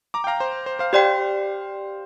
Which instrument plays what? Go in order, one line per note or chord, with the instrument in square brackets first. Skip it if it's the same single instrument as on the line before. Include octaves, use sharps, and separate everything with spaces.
[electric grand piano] A#5 D6
G5
F5 A#5
C5
C5
C5 F5
[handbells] G4 D5 G5 [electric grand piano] C5 F5